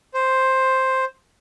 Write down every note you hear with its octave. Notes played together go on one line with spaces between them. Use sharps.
C5